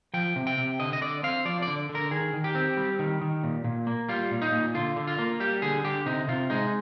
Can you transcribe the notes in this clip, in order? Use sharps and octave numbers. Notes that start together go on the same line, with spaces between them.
F3 G5
C3
G5
C3
D3 D#5
D#5
D3 D5
C4 F5
F3 D5
D3 D5
D3
A#4
D#3 G#4
D#3
G4
C4
G3
D#3
D#3
A#2
A#2
A#3
G3 F4
A#2
D#4
A#2
D3 F4
D3
F4
A#3
G3 G4
D3 G#4
D3 G4
C3 D#4
C3 F4
G#3 D#4